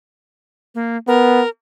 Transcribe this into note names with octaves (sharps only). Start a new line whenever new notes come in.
A#3
B3 A#4